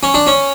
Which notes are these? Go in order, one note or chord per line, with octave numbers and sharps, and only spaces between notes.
C#4
D4
C#4